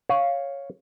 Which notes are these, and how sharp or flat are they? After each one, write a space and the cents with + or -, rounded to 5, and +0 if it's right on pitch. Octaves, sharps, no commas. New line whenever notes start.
C#5 +0 F5 +0